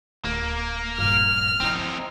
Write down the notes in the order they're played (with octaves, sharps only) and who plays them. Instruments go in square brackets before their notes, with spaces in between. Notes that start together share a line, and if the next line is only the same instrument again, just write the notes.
[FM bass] D1 [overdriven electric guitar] A#3
[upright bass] A#1 G2 [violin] F6
[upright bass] F3 E4 [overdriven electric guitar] C4 D#4